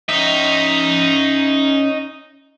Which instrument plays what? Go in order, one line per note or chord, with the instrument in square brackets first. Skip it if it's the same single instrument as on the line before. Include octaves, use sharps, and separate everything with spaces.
[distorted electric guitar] C#4 E5 [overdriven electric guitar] D#4 D#5